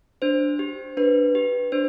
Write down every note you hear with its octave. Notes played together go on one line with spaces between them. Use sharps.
D4 C5
G4
D4 B4
G4
D4 C5